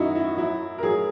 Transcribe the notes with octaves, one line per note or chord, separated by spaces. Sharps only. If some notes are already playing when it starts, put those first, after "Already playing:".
Already playing: F#2 D#3 D#4 E4 F#4
E4
F#3 E4
A#4
F#3 G#4